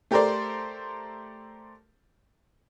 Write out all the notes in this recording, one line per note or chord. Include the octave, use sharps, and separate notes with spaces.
A3 G4 A4 A#4 C5 D5